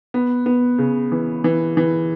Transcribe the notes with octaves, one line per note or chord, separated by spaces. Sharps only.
B3
B3
C#3
E3
E3
E3